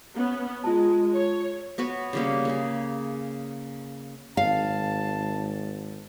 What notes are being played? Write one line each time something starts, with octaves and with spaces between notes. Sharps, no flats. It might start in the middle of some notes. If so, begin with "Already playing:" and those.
B3 C#4
G#3 F4 A5
C#5
B3 F#4 B4 C#5
C#3 G3 A#3
A#3 G#4
G#1 F5 A5